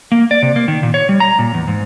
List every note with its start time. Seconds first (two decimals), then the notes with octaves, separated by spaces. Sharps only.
0.12 A#3
0.31 D5
0.42 C3
0.56 A#3
0.68 D#3
0.83 A#2
0.94 C#5
1.09 G3
1.20 A#5
1.39 A#2
1.54 E2
1.68 G#2